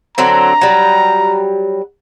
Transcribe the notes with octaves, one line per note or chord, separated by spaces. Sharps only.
D3 F#3 C4 A#5
F#3 G3